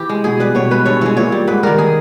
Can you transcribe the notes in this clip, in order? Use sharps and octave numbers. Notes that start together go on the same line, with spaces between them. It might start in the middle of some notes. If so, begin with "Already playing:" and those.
Already playing: E3 E4 G4
G#3
B2 G#4
G3 B4
B2 C#5
G#3 B4
G2 C#5
E3 G#3 C#5
A#2 C#5
G3
G#2 B4
D#3 G3 A#4
G#4